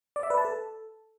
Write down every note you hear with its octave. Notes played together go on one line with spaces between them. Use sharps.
D5
E5
B4
A5
A4